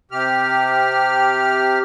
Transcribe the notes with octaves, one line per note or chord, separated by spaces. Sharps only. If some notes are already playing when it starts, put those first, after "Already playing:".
C3 G4 F6